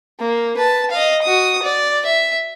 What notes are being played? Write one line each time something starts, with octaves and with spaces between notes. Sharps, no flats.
A#3
B4 A5
D#5 F5
F#4 D#6
D5
E5